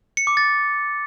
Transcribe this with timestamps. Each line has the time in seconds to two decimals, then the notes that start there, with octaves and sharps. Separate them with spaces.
0.17 C#7
0.27 D6
0.37 A6